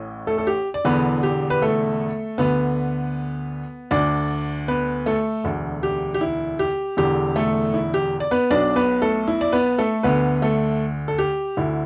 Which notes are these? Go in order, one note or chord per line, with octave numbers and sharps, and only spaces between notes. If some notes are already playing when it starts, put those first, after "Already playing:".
Already playing: A1 A2
A3 A4
A4
G4
D5
E1 E2 D3 B3 B4
G4
B4
A3 A4
D2 D3 B3 B4
D2 D3 D4 D5
B3 B4
A3 A4
E1 D2 D3
G4
G4
E4
G4
E1 E2 D3 G4
A3 A4
E4
G4
D5
B3 B4
B1 B2 D4 D5
B3 B4
A3 A4
E4
D5
B3 B4
A3 A4
D2 D3 B3 B4
A3 A4
A4
G4
D2 D3 E4